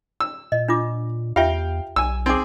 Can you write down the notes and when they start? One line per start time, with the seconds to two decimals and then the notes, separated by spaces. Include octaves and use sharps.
0.20 E6
0.52 A#2 D#5
0.68 D4 F4 D6
1.36 E2 F4 G4 E5 F5 G5
1.96 B1 G#5 E6
2.26 C4 D#4 G#4 D6